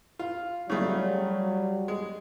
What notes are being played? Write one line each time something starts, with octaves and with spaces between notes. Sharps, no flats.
F4
C#3 F#3 G3 A3 F4
G#3